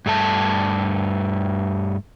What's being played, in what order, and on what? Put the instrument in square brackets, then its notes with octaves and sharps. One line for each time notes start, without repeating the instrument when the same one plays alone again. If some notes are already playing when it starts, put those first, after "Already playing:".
[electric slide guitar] G2 A3 A5